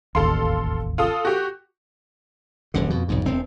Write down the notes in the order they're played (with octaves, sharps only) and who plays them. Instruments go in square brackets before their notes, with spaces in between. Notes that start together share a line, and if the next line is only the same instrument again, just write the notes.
[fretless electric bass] E1 A1 D#2 [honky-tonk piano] A4 F5 C6
[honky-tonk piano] F4 A4 D#6
F#4 G4
[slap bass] D#1 F#2 D3
F2 B2
B1 F2 G#2
E1 C4